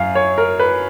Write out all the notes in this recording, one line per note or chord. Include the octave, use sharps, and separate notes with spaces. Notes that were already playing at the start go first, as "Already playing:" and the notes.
Already playing: F#2 F5
C#5
A#4
B4